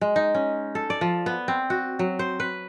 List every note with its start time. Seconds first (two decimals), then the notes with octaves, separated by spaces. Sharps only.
0.01 G#3
0.16 D#4
0.35 C#4
0.75 A4
0.90 D5
1.01 F3
1.26 B3
1.48 C4
1.70 F#4
1.99 F#3
2.19 C5
2.40 B4